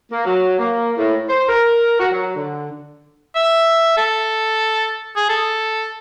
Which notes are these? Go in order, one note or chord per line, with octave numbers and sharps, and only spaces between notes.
A#3
F#3
A#3
A2
C5
A#4
F#4
F#3
D3
E5
A4
G#4
A4